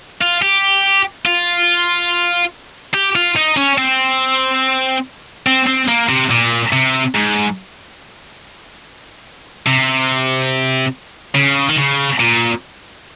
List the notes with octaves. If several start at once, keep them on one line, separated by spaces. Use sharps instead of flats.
F4
G4
F4
G4
F4
D#4
C#4
C4
C4
C4
A#3
C3
A#2
C3
G#2
C3
C#3
D#3
C#3
A#2